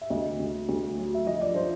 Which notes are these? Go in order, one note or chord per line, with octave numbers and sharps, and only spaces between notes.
E5
D2 D#5
D2
D2
F#3
E5
F3 D#5
D5
F3 C5